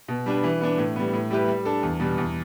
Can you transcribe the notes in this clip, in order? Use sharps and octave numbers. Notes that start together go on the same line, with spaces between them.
B2
G3 D4 B4
E3
B3 D4
A2
G3 B3
A2
G3 E4 G4 B4
G3
D4 A4
E2
B2 G3
E2